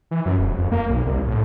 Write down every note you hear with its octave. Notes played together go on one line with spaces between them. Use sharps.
E3
F#2
E1
F2
A#3
B1
C2
A2